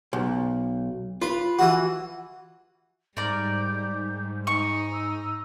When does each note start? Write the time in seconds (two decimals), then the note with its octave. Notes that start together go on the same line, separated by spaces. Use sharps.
0.13 B1
1.22 F4 B4
1.59 E3 F#4
3.17 G#2 G3 A#4 D5 G6
4.47 D#4 G#5 C#6
4.92 E6